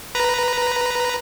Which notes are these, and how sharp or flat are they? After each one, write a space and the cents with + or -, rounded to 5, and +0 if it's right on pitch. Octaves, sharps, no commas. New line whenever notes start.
B4 +0 A#5 +0